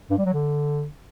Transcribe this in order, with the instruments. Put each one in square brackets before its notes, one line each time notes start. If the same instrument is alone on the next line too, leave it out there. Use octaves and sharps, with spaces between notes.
[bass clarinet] G2
G3
F#3
D3